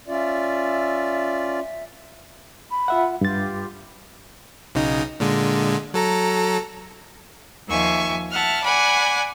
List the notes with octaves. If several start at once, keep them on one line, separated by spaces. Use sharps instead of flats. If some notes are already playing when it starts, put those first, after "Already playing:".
C#4 F4 D5 E5
B5
F4 E5 F#5
G2 F4 G4 A6
B1 C#3 D#4
A#2 D3 G#3
F#3 A4 A#5
D#2 F3 E5 G#5 C#6
E5 F#5 A5 F6
D5 F#5 G#5 B5